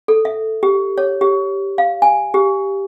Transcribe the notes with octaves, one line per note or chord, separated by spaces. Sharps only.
A4
E5
G4
C#5
G4
F5
G#5
G4